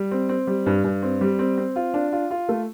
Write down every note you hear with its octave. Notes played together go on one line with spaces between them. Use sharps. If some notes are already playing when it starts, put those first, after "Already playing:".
Already playing: G3
C4
C4
G3
G2
G2
C4
G3
C4
C4
F4
D4
F4
F4
A3